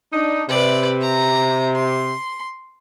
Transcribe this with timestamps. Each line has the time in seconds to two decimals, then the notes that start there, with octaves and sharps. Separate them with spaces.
0.13 D4 D#4
0.49 C3 B4 D5
1.01 A#5
1.75 C6